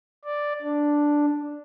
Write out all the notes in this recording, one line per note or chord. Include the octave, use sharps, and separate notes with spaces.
D5
D4